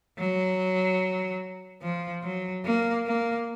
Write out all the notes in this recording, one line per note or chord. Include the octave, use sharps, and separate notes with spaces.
F#3
F3
F#3
A#3
A#3